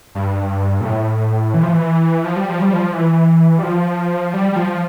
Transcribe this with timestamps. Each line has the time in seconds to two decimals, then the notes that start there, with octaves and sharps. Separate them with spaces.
0.15 G2
0.81 A#2
0.85 A2
1.54 E3
1.63 F3
1.72 E3
2.24 F3
2.36 G3
2.49 F3
2.62 G3
2.73 F3
2.93 E3
3.59 G3
3.63 F3
4.34 G3
4.52 G3
4.56 F3